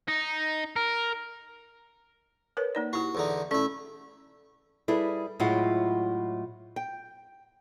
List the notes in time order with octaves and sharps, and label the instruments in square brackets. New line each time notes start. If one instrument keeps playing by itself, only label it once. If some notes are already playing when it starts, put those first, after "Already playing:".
[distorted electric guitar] D#4
A#4
[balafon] A#4 B4 C#5
A#3 D#4 D5
[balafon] E4 G4 [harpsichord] F#4
[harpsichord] E2 D3 D#4
[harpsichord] A3 E4 [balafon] C#4 D5
[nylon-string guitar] G3 E4 G#4 A4 B4
A2 F#3 G#3 E4 F4 F#5
G5